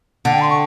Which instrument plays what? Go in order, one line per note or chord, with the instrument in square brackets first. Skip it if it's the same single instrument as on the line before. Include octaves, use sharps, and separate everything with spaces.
[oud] D3 [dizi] F#5
[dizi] G5
C6
C#6